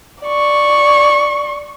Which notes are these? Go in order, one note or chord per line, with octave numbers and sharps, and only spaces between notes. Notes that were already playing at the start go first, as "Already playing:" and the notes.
D5 C#6